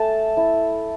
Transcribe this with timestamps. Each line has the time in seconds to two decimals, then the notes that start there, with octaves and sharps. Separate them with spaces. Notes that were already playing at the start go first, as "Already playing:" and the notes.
Already playing: A3 A5
0.37 E4